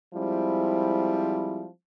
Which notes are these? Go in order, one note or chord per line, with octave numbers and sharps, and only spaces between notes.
F3 G3 G#3 C4 E4